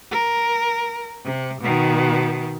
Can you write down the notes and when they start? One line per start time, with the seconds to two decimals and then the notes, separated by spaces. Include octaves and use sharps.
0.11 A#4
1.24 C3
1.61 B2 D#3